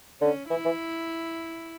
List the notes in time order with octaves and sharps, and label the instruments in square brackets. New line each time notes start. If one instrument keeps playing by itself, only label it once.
[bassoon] D3 [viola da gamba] C#4
[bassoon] E3 [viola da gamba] E4
[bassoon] E3